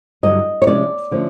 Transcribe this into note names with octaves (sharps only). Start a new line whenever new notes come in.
G2 D3 F#3 D#5
C#5
C3 F3 G#3 C#4 D5
D3 F3 A3 C#4